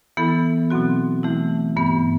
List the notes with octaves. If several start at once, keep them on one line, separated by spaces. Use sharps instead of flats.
E3 B3 E4 A4
B2 F#3 C4 F#4
E3 A3 E4
G2 E3 B3